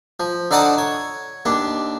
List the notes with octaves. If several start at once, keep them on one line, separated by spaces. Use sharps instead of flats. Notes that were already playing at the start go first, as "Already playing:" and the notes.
F3
D3 D#4 D5 F#5 A5 D#6
C#5
D#2 D4